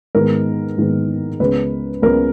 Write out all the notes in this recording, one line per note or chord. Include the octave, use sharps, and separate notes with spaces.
G#2 D#3 G#3 B3 A#4
G#2 D#3 G#3 B3
C#2 C#3 G#3 B3 B4
C#2 C#3 G#3 B3 A#4